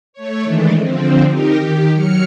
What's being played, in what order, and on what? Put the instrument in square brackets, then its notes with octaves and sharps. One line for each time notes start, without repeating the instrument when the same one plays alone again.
[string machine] A3 C#5
D#3 E3 G#3 A3 D4
D3 F3 C4
D#4 G4 A#4
D#3 G4
F#3 F6 C#7